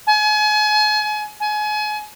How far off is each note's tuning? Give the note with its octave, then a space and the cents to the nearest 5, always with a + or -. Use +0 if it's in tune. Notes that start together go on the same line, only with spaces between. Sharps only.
G#5 +35
G#5 +30